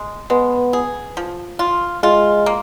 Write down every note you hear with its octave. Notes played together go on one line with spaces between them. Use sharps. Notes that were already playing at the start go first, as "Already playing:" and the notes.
Already playing: G#3
G#3 B3
G#4
F3
F4
G#3 F4
A#3